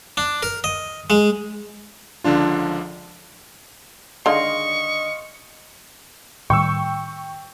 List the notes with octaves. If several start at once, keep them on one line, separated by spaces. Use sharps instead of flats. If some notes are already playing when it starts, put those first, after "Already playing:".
D4
A#4
D#5
G#3
C#2 D3 F3 D4 F4
D3 D#3 G#3 D#5 F5 C6 C#6
A2 D#3 G3 G5 C#6 E6